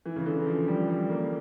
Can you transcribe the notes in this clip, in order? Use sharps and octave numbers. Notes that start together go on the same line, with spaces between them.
E3
C#3
D3
F3
G3
G3
A#3